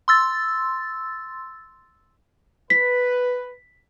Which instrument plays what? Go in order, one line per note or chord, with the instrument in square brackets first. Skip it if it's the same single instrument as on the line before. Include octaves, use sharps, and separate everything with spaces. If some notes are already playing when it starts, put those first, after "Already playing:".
[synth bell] C6 E6 A6
[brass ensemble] B4 [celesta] B6